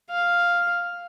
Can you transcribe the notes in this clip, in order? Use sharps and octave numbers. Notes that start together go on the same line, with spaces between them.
F5